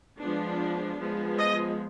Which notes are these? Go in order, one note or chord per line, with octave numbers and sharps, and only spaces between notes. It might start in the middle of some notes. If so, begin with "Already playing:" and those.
F3 G#3 B3 D4
F3 G#3 B3
D#5